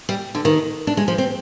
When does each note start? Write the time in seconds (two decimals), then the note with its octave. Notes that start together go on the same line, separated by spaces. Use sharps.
0.09 G3
0.35 D3
0.45 D#3
0.87 D4
0.97 G#3
1.08 F3
1.18 C4